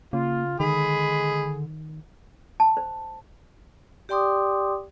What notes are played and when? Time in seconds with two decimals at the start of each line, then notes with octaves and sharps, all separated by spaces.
0.13 C#3 A#3 F4
0.60 D3 D#3 G#3 G#4 B5
2.60 A5
2.77 C5
4.09 G4 D5 G5 C6 D6 D#6